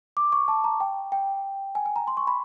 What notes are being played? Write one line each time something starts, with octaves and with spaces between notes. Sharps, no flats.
D6
C#6
A5
A#5
G5
G5
G#5
G#5
A#5
C6
C#6
B5